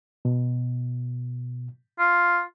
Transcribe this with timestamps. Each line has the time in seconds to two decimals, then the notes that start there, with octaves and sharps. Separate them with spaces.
0.25 B2
1.99 F4